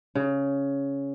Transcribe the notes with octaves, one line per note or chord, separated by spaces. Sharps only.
C#3